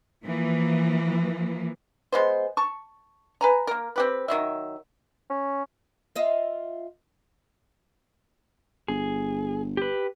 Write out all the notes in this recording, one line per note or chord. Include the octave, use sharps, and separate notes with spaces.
E3 F3 A#3
G#3 B3 C5
A5 C#6
B4 G#5 A#5
A#3 A#4
C4 G4 B4
D#3 F#3 E5
C#4
F4 D#5 E5
G1 G#4
G4 B4